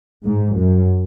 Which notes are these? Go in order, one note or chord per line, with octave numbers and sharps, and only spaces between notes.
G#2
F#2